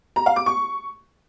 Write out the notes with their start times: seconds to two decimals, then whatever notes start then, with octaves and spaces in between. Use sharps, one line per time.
0.16 A#5
0.26 F5
0.36 D6
0.46 C#6